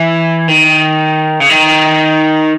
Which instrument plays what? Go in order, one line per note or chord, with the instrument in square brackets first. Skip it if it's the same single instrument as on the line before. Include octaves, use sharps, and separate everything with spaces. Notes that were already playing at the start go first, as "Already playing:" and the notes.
Already playing: [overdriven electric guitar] E3
D#3
C#3
D#3